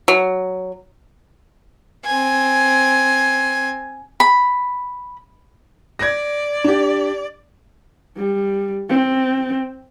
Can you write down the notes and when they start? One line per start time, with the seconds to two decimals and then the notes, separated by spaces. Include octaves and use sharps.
0.08 F#3
2.06 C4 G#5
4.20 B5
5.99 D5 G#6 A#6
6.64 D4 G4
8.17 G3
8.89 C4